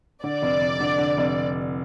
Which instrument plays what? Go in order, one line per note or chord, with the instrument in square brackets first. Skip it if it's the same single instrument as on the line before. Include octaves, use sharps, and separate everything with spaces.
[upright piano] D3 [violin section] D5
[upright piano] F1
F1
D3
D3
F1